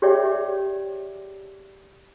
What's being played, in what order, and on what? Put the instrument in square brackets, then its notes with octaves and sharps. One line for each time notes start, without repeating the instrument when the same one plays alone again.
[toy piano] G4 G#4 C#5 D5 E5 G5